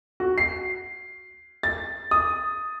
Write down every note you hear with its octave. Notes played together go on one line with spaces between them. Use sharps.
F#4
C7
A6
D#6